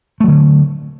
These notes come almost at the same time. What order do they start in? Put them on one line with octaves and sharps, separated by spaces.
A3 F#3 D3